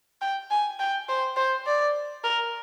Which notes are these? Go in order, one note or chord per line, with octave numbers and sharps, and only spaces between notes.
G5
G#5
G5
C5
C5
D5
A#4